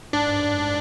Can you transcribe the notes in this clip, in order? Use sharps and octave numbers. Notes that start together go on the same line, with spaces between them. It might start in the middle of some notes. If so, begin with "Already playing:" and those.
G#2 D4
G2
F#2
G2